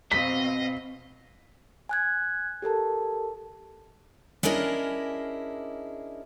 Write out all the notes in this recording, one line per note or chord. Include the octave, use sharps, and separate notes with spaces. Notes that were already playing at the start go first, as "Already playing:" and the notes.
B2 C4 D#5 F5 B6
G#5 F#6 G#6
G4 A4 A#4 A5
C#4 D4 E4 G#4 A#4 D#5